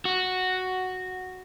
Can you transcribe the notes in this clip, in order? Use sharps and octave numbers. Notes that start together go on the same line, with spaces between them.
F#4